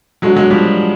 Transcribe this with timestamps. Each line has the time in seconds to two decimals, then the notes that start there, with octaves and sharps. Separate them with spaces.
0.22 F#3 G#3 D4 F#4 A4
0.36 F#3 G#3
0.50 F3 G3